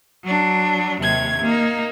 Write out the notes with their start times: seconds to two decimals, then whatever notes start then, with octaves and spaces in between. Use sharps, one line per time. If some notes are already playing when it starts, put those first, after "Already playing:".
0.24 F#3 D4
1.01 D#2 C3 G#6
1.42 A#3 D#4